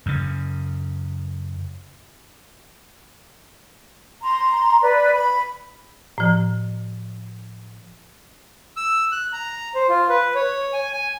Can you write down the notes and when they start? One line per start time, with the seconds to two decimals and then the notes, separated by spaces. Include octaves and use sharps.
0.06 F#2 C#3
4.22 A#5 C6
4.82 B4 D5
5.13 B5
6.18 A2 F3
8.77 E6
9.12 F#6
9.33 A#5
9.75 C5
9.89 F4
10.09 B4
10.35 C#5
10.73 G#5
10.92 G#5